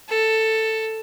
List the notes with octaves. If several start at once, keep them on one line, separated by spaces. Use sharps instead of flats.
A4